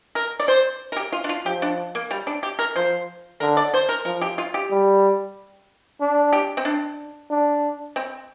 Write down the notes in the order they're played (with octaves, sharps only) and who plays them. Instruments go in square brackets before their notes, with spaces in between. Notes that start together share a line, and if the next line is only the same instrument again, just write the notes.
[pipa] A#4
D5
C5
A#4
G4
F4
D4
F4
[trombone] F3 [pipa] G4
[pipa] D4
A#3
G3
D4
G4
A#4
[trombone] F3 [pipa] C5
[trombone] D3 [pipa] A#4
[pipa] D5
C5
A#4
[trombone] F3 [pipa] A#4
[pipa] G4
F4
G4
[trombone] G3
D4
[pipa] G4
C4
D4
[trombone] D4
[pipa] C4